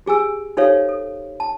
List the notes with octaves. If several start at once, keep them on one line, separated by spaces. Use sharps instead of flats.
G4 G#4 G#5 E6
D#4 G4 A4 C5 C#5 F5
A4
A5